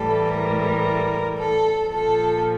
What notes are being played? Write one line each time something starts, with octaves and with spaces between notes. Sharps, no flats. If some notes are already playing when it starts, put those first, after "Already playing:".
Already playing: A2 E3 G3 A4
A#4
A4
A#2 F3 A4